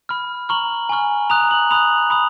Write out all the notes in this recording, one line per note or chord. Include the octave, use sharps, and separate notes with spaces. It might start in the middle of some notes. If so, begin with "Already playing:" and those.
B5 F6
A#5 C#6 F6 F#7
G#5 C#6 F6
A#5 D#6 F#6 F7
F#7
B5 D#6 F#6 F7
B5 D#6